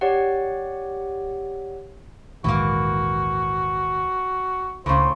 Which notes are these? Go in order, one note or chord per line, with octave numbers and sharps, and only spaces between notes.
G4 C#5 D5 F#5
A#1 D#2 G#2 E3 A#3 F#4
C#2 A2 C#3 C5